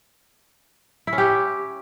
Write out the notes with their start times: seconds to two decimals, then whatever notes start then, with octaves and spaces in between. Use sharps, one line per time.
1.07 E4
1.13 C#4
1.18 G4